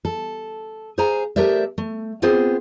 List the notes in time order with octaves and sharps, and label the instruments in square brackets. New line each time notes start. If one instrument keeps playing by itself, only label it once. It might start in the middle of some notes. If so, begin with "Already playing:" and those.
[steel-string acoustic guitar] A4
G#4 C5 F5 G#5 A#5
A3 G4 A#4 C5 D5 E5
A3
B3 C4 F4 G#4 C5